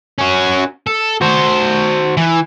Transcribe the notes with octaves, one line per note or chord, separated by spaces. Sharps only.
C#4 F#4
A4
F#4 C5
E3